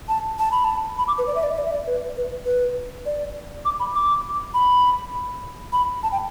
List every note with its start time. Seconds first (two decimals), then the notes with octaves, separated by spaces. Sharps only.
0.09 A5
0.39 A5
0.52 B5
0.65 A5
0.98 B5
1.08 D6
1.18 B4
1.27 D5
1.35 E5
1.43 D5
1.51 E5
1.58 D5
1.66 E5
1.73 D5
1.87 B4
2.17 B4
2.46 B4
3.06 D5
3.65 D6
3.80 B5
3.95 D6
4.54 B5
5.73 B5
6.03 A5
6.12 G5